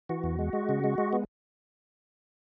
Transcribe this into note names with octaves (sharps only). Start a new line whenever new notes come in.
E3 F#4
E2
G#3
G#3
C#3
G#3
G#3
B3